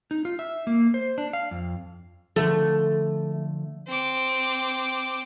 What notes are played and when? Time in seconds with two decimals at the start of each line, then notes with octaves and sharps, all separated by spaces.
0.11 D#4
0.25 F4
0.39 E5
0.67 A#3
0.94 C5
1.18 D4
1.33 F5
1.51 F2
2.36 D3 F3 A3
3.88 C4 D6